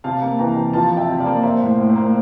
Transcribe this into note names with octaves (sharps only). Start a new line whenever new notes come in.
C3 F5 A5
A#3
E3 G5 A#5
C3
F3 F5 A5
C3
E5 G5
C3
D5 F5
A#3
A#3 C5 E5
A2
C5
A2
C5
A#3